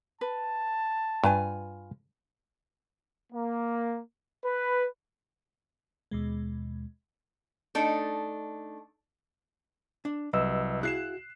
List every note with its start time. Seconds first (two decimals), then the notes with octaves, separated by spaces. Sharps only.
0.21 B4 A5
1.24 G2 F4 B4 G#5
3.33 A#3
4.44 B4
6.11 D#2 B2 G#3
7.75 A3 D4 D#4
10.05 D4
10.33 C2 F#3 B4 D#5 E6
10.83 E4 F#4 G#4 F5 F#6 C7 E7